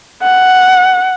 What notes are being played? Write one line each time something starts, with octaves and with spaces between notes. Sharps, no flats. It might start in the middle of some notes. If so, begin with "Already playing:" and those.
F#5